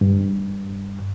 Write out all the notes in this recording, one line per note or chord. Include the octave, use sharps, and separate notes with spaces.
G2